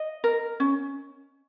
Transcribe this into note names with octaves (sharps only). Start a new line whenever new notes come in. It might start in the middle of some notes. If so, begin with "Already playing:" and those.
Already playing: D#5
A#4
C#4